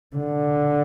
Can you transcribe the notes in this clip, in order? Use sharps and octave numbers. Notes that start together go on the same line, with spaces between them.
D3